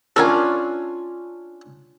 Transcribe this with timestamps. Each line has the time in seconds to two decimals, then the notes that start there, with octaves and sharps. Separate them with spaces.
0.16 C#4 D4 F4 A4 A#4 G#5